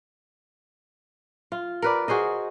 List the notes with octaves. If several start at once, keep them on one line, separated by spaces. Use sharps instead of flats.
F4
A#4 B4 D5
F#4 G#4 C5 D#5